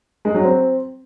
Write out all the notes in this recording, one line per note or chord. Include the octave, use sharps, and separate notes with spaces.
G#3
F#3
C4